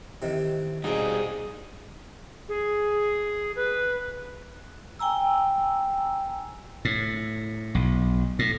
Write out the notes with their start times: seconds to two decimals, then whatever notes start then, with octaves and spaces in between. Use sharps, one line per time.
0.22 C3 D#3 E3
0.84 B2 G3 C4 D#4 G#4
2.49 G#4
3.56 B4
4.99 G5 G#5 A#5 E6
6.85 A2
7.75 B1
8.39 A2